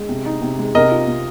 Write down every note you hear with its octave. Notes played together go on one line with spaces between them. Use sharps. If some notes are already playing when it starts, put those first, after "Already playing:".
Already playing: G#3
C3
D#4
C3
G#3
C3 A#4 D#5
F4
C3